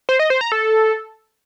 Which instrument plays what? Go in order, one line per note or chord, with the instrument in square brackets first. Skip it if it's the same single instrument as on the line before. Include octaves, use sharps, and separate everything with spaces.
[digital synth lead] C5
D#5
C5
A#5
A4